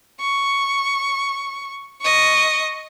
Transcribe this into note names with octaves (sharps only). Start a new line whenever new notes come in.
C#6
D#5 C#6